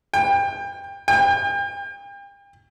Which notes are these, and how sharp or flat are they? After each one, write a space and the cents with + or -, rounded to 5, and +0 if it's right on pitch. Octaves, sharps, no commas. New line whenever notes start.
G5 +25
G5 +40